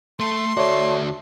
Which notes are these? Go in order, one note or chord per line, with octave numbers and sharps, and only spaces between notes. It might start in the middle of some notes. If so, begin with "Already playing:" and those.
A3 A4 C6
D2 A3 F#4 C#5 D5